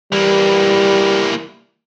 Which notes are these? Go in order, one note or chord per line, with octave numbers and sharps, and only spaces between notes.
E3 G3 A#3